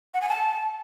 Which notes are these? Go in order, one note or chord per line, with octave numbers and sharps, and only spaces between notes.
F#5
G#5
A5